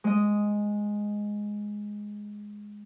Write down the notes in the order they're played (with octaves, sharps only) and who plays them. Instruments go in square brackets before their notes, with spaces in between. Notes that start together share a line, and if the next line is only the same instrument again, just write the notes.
[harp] G#3 D#5